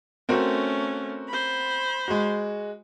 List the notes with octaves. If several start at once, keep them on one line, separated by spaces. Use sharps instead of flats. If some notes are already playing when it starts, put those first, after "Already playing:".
A3 C4 C#4 F#4 A#4
C5 B5
G#3 F#4